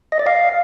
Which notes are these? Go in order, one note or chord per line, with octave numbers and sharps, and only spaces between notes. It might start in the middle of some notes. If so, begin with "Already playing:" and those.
D#5
D5
F5